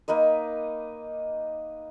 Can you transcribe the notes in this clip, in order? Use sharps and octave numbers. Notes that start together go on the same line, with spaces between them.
A#3 D#4 B4 D#5